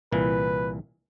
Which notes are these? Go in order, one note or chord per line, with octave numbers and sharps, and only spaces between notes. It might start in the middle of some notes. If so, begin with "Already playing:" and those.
C2 A#2 E3 B4